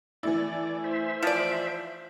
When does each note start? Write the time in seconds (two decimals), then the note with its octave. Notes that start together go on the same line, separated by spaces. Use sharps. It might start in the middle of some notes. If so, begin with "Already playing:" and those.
0.23 E3 A3 E4 D5
0.84 C5 E5
1.23 F3 D5